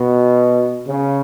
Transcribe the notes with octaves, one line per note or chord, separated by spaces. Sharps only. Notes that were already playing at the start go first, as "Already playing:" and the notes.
Already playing: B2
C#3